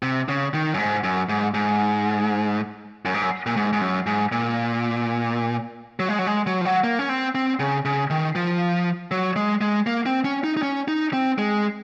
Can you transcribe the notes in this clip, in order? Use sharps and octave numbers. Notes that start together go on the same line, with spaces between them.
C3
C#3
D#3
F#2
G#2
F#2
G#2
G#2
F#2
G#2
F#2
A#2
G#2
G#2
F#2
G#2
A#2
F#3
G#3
F#3
G#3
F#3
F3
F#3
A#3
C#4
C4
C4
C#3
C#3
D#3
F3
F#3
G#3
G#3
A#3
C4
C#4
D#4
D#4
C#4
D#4
C4
G#3